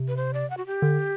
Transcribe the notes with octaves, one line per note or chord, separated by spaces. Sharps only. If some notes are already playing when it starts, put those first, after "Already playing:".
Already playing: C3
B4
C5
D5
F#5
F#4
G4
D3